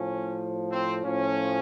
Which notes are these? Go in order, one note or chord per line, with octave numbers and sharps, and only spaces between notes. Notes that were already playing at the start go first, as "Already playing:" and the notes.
Already playing: A2 F3 C#4
C4
A2 F3 C#4